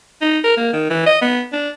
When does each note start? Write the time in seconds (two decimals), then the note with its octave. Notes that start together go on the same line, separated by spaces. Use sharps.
0.21 D#4
0.44 A#4
0.57 A#3
0.73 D#3
0.90 E3
1.06 D#5
1.22 B3
1.53 D4